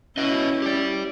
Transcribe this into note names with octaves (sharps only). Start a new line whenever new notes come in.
C#4 E4 B4 D#5
G4 D5